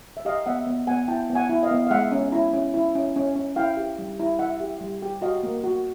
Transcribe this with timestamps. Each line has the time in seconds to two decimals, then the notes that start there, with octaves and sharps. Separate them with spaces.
0.17 E5
0.25 G4 D#5 F5
0.46 B3 E5 F#5
0.66 B3
0.87 B3 F#5 G#5
1.08 E4 G5 A5
1.30 B3
1.35 F#5 G#5
1.49 E4
1.63 D#5 F5
1.71 B3
1.87 F5
1.91 G#3 E5 F#5
2.12 C#4
2.32 E4
2.53 C#4
2.74 E4
2.95 C#4
3.16 C#4
3.36 C#4
3.56 E4 F5 G5
3.77 G4
3.98 G3
4.19 E4
4.39 E4 E5 F#5
4.60 G4
4.80 G3
5.02 G4
5.22 F#4 D#5 F5
5.43 A#3
5.64 F#4